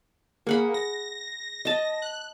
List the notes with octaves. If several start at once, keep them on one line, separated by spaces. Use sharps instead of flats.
A#3 G#4 F#5 B5
A#6
D#5 A5
F#6